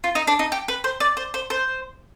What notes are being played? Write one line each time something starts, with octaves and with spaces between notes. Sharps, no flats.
F4
D#4
D4
D#4
G4
B4
C5
D5
C5
C5
C5